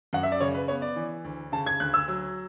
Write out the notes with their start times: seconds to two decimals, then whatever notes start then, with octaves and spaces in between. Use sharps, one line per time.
0.13 F#2 F#5
0.23 E5
0.32 D5
0.40 C#3 C#5
0.54 B4
0.68 B3 C#5
0.82 D5
0.96 E3
1.24 D2
1.52 C#3 A5
1.66 G#6
1.80 D2 F#6
1.94 E6
2.08 F#3